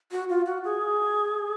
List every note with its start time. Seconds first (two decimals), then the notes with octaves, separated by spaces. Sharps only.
0.12 F#4
0.29 F4
0.46 F#4
0.65 G#4